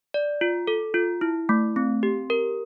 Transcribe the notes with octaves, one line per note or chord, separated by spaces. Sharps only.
D5
F4
A4
F4
E4
A3
C4
G4
A#4